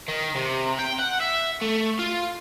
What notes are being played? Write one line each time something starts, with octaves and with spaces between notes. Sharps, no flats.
D#3
C3
G5
F#5
E5
A3
F4